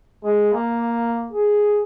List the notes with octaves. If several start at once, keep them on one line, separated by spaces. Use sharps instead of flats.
G#3
A#3
G#4